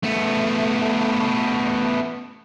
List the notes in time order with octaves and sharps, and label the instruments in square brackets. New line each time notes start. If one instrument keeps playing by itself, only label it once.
[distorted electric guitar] A3 B3